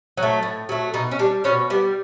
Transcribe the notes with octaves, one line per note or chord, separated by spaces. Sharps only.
F#3
A3
A2
F#3 A3
B2 D#4
C#4
G3 D4
B2 C#4
G3 B3